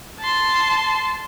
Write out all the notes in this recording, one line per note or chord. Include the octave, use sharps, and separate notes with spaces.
A5 C6